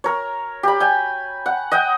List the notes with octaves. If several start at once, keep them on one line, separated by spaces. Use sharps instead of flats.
A#4 C#5
G4 B5
G5 G#5
F#5
D#5 F#5 G5